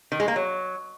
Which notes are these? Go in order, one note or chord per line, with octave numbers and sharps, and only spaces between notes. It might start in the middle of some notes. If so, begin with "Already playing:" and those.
D#3
G#3
A#3
F#3